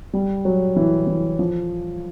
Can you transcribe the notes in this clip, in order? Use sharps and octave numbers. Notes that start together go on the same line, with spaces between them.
G3
F#3
E3
E3
F3